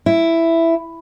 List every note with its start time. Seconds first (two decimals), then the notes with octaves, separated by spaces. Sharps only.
0.06 E4